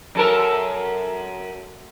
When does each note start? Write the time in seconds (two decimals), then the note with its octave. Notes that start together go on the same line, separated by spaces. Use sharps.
0.15 F#2 A4 A#4